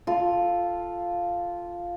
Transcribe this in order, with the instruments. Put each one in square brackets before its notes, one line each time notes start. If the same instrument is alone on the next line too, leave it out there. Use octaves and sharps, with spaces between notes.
[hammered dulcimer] F4 A4